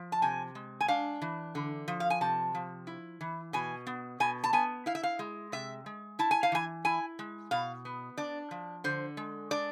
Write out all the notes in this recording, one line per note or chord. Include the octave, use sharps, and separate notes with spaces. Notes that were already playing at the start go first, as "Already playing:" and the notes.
Already playing: F3
A5
C3 G#5
G#3
G#5
D4 F5
E3
D3
F3
F5
G#5
C3 A5
F3
E4
E3
B2 G#5
B3
B2 G#5
A5
B3 G#5
E4 F5
E5
F5
G#3
C3 E5
G#3
E4 A5
G#5
F5
E3 G#5
E4 G#5
G#3
B2 F5
B3
D4 D5
F3
D3 C5
G#3
D4 D5